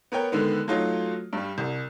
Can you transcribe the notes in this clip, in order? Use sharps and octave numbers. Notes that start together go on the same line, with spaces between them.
B3 A#4 C#5 G5
D3 D#3 G#3 B3
F#3 A3 D#4 F4 F#4 C#5
G2 G3
C2